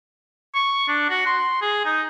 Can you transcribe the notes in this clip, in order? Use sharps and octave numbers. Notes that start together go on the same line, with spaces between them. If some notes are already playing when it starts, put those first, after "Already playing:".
C#6
D4
F#4
C6
G#4
D#4